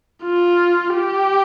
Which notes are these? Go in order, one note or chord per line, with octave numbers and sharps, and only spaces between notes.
F4
G4